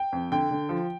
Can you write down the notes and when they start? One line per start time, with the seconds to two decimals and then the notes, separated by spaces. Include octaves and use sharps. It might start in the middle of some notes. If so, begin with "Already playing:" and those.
Already playing: G5
0.12 F2
0.32 D3 G5
0.51 D3
0.69 F3